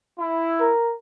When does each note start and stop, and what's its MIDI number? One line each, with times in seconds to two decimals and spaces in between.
0.20 0.71 64
0.60 0.94 70